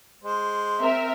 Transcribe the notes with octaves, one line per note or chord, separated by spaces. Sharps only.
G#3 C5
C4 A#4 E5